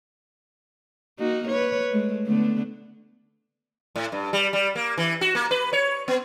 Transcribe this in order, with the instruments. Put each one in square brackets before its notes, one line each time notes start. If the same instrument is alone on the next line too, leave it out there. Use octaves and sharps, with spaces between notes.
[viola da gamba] A#3 D#4 F#4
B4 C#5
G#3 A3
D3 A3 B3
[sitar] A2
G2
G3
G3
A#3
E3
F#4
A#3
B4
C#5
B3